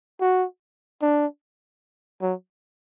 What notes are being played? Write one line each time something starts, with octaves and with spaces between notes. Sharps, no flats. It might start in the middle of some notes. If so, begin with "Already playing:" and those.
F#4
D4
F#3